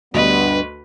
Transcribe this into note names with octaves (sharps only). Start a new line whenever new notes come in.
D2 G2 G3 B3 B4 D#5